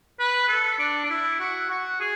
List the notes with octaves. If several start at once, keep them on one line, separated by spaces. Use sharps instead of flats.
B4
A4
D4
D4
E4
F#4
F#4
G#4